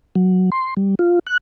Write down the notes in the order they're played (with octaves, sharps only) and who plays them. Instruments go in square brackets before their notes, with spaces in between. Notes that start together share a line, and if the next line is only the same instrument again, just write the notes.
[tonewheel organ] F#3
C6
G3
F4
F#6